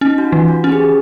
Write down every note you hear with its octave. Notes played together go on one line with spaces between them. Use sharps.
C#4 D#4
F#4
F4
E3
F#4
C#4 G4
G#4